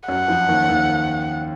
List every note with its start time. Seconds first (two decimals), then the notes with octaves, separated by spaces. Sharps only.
0.08 F#2 F#3 F#5
0.28 F2 F3
0.48 D#2 D#3
0.69 D#2 D#3